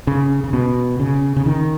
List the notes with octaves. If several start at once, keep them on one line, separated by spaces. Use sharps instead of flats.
C#3
C#3
B2
C#3
C#3
D#3